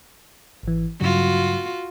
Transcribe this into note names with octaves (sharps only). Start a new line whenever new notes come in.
G#1 E3
G2 C#3 F#3 F4 F#4